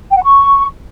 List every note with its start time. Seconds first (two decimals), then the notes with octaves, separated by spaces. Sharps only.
0.11 G5
0.17 F#5
0.23 C#6